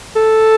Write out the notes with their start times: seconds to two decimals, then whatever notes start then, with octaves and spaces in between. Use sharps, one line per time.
0.16 A4